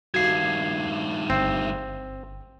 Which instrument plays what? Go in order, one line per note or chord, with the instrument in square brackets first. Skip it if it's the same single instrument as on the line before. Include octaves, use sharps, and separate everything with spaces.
[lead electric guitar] G2 D#3 [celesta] F#4 F5 [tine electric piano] G#6 C7
[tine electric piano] G1 [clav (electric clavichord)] C4